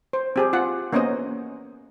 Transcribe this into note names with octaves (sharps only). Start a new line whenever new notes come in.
C5
C4 G4 G#4
F4 F#5
A#3 B3 C#4 C5 C#5 D#5